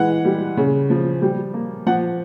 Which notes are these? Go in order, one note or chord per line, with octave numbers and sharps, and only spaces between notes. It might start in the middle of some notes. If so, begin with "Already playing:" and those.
Already playing: E3 G#3 F#5
G3
C#3
F3
G3
A#3
F3 F#5